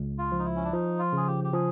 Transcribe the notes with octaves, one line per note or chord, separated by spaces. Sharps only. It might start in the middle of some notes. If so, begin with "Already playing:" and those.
Already playing: C#2
F4
F3
D#4
E4
C#4
D4
F3 D#4
F4
C#3 G#4
G4
G4
F3 G#4